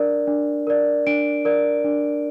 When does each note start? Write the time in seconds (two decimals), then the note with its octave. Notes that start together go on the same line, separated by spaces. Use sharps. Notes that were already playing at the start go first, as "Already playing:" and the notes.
Already playing: D4 A#4 D5
0.27 D4
0.67 A#4 D5
1.07 D4 D7
1.45 A#4 D5
1.85 D4